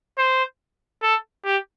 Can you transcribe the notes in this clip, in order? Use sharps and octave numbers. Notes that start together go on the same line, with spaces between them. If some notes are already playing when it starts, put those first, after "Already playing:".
C5
A4
G4